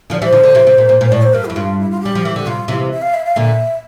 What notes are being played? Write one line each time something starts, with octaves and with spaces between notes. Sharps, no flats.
D3 F3 D5
E3 G3 C5
D3 F3
D3
C3 E3
C3
A#2
A#2
A#2
A2 D5
C5
G2 A#4
F2 E4
G2 F4
E4
F4
G3 G4
F3
E3
D3
C3 F4
C3 E3 F4
E5
F5
E5
F5
A#2 D3 E5